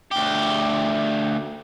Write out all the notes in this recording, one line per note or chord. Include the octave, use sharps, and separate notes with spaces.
D2 G4